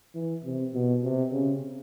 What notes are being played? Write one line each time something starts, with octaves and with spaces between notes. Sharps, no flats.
E3
C3
B2
C3
C#3